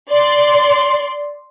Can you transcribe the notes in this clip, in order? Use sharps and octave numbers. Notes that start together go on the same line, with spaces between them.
D5 C6